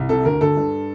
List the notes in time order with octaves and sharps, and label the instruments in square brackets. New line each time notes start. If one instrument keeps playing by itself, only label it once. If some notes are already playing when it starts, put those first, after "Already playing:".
Already playing: [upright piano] C2
C3 A4
D2 A#4
D2 A4
G2